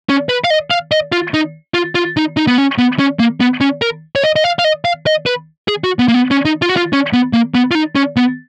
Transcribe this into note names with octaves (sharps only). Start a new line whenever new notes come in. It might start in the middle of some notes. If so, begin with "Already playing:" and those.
C#4
B4
F5
D#5
F5
D#5
F4
D#4
F4
F4
D#4
D#4
B3
C#4
B3
C#4
A#3
B3
C#4
A#4
C#5
D#5
D#5
F5
F5
D#5
F5
D#5
B4
G#4
F#4
B3
A#3
B3
C#4
D#4
F4
F#4
F4
C#4
B3
A#3
B3
F4
D#4
C#4
B3